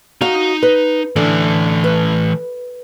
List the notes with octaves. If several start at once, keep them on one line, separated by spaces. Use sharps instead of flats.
D#4 F#4 F5 A#5
B4
A2 D3 E3
B4